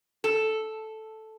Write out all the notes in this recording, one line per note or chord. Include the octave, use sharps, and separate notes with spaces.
A4